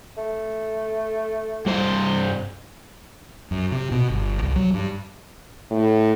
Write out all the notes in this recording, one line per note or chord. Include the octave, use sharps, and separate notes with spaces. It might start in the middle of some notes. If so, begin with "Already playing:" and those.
A3
G2 C5
F#2
C3
B2
G1
C2
F#3
G2
A2